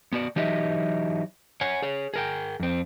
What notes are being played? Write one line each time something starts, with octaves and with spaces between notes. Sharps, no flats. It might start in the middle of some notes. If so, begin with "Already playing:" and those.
B3 F#4 D5
E3 F#3 D#4 G4 D#5 E5
C#5 F#5 G#5
G#4 C#5
G#4 A#4 G5
F2 C4